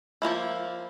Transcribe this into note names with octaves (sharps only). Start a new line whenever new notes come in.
F3 G#3 A#3 E4